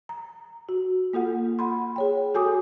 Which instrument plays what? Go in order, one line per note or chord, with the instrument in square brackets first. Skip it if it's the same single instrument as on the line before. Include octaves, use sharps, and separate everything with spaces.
[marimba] A#5
F#4
A#3 F4 A4 F#5
F#5 B5 C6
G#4 C#5 G5
F#4 A4 G#5 D6 D#6